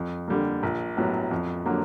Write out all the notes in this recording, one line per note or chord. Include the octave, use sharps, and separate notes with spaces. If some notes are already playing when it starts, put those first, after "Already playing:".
Already playing: F2
D3 G3 A#3
A#1
A2 F#3 B3
F2
D3 F#3 A#3